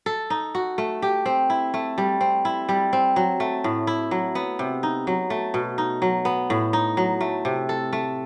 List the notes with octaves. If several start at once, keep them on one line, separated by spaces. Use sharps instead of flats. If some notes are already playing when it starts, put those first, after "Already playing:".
A4
D#4
F#4
A3
G4
C4
E4
A3
G3
C4
E4
G3
C4
F#3
A3
A2
E4
F#3
B3
C3
D#4
F#3
A3
B2
D#4
F#3
B3
A2
D#4
F#3
A3
C3
A4
A3